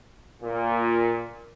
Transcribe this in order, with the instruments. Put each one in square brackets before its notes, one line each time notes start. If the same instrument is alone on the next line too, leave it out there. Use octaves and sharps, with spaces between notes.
[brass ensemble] A#2